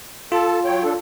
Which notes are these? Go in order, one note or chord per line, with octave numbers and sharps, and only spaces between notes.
F4 A4 A5
F#3 C#5 G5
D4 A4